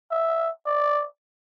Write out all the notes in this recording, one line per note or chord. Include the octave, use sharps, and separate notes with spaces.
E5
D5